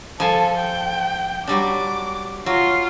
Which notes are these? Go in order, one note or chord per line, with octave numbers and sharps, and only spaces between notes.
F3 A4 G#5
G5
F#3 G3 D4 D6
F#3 F4